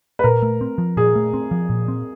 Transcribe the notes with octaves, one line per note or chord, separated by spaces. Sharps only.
B4
A#2 A#4
A3
C4
F3
A#2 G#4
A3
C4
F3
A#2
C4